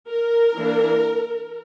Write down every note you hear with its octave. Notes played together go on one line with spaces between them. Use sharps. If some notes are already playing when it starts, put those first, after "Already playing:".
A#4
E3 A#3 D4